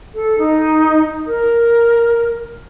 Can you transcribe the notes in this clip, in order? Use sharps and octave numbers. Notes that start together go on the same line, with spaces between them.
A4
D#4
A#4